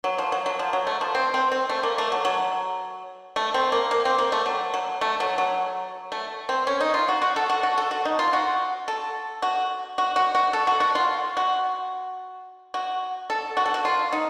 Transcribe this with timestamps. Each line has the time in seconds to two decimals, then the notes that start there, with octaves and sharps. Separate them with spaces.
0.04 F#3
0.18 F3
0.32 F#3
0.46 F#3
0.59 F3
0.73 F#3
0.87 A3
1.01 F3
1.15 C4
1.34 C4
1.52 C4
1.69 A3
1.83 A#3
1.98 A3
2.12 F#3
2.25 F#3
3.36 A3
3.54 C4
3.72 A#3
3.91 A#3
4.05 C4
4.18 A#3
4.32 A3
4.46 F#3
4.74 F#3
5.01 A3
5.20 F#3
5.38 F#3
6.12 A3
6.49 C4
6.67 C#4
6.80 D#4
6.94 F4
7.08 F#4
7.22 F#4
7.36 A4
7.49 F#4
7.63 F#4
7.78 A4
7.91 F#4
8.05 D#4
8.19 F4
8.33 F#4
8.88 A4
9.42 F#4
9.98 F#4
10.16 F#4
10.35 F#4
10.53 A4
10.67 F#4
10.80 F#4
10.95 F4
11.37 F#4
12.74 F#4
13.30 A4
13.57 F#4
13.66 A4
13.74 F#4
13.85 F4
14.12 D#4